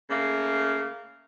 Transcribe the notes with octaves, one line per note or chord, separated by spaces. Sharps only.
C#3 A3 A#3